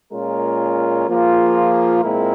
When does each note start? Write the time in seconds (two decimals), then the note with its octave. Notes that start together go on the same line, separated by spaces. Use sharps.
0.12 A#2 G#3 C#4 F4 A#4
1.08 F3 A#3 F4 G#4
2.03 A#2 G#3 C4 E4 A#4